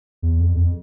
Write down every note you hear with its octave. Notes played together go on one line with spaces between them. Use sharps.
E2
F2
F2